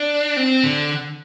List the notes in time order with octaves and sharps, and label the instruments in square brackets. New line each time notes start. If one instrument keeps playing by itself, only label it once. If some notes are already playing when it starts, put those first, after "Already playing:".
Already playing: [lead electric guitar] D4
C4
D3